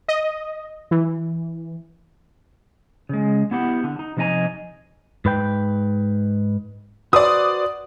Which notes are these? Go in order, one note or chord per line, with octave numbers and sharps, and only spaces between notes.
D#5
E3
C#3 G#3
B3 E4 G4 F#5
D3
D#4
C3 F3 D#4 D#5 G#5 A#5
G#2 B4 G5
F#4 B4 C5 D5 D#6